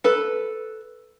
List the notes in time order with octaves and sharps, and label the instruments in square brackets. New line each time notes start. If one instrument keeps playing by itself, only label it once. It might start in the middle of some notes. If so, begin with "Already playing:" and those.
[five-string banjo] A4 B4